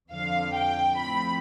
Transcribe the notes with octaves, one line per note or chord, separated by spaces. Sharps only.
F2 D3 F3 F5
G5
A2 F3 C4 B5